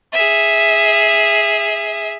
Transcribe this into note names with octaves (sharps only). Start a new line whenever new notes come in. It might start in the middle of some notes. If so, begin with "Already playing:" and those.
G#4 E5